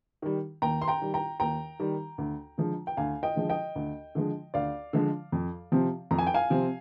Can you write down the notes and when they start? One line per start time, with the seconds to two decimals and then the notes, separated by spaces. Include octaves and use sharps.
0.22 D#3 G3
0.62 D#2 G5 A#5
0.82 C6
0.88 G5 A#5
1.02 D#3 G3
1.14 G5 A#5
1.40 D#2 G5 A#5
1.80 D#3 G3
2.18 D2
2.58 D3 F3 G#3
2.87 G5
2.97 D2 F5 G#5
3.23 D#5 G5
3.36 D3 F3 G#3
3.49 D#5 G5
3.76 D2
4.15 D3 F3 G#3
4.54 D2 D5 F5
4.93 D3 F3 G#3
5.32 F2
5.72 C3 F3 C4
6.11 F2 A#5
6.18 G#5
6.27 G5
6.34 F5 G#5
6.50 C3 F3 C4